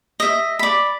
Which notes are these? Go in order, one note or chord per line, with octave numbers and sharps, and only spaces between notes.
D#5 E5
D5 B5